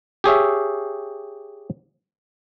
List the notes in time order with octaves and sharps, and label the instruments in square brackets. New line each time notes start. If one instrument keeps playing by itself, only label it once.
[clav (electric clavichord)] G4 G#4 C#5 E5